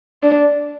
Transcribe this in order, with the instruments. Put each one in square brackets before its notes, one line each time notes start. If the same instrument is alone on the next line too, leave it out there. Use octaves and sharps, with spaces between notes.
[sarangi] D4